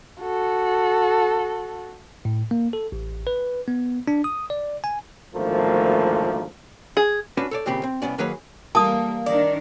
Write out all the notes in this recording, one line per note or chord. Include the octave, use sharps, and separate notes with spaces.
F#4 A4
A2
A#3
A4
A1
B4
B3
D4
D#6
D5
G#5
G#1 D2 F3 A3 A#3
G#4
C#4 D4 F#4 B4
A4 C#5 D5
D#2 A#2 C#3 C4 G4 B5
C4
C2 F3 B3 C#4 D5
D#3 F#3 A#3 G#4 B4 C#5
E3 G3 A#3 A5 D#6
D#3 D4 A#4 D5